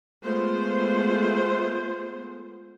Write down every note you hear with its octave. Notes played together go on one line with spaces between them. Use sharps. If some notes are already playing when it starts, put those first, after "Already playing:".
G#3 A3 B3 F4 C5